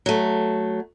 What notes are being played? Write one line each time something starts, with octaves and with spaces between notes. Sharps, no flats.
F#3 A3